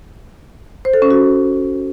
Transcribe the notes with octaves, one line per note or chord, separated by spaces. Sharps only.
C5
A4
C#4
F#4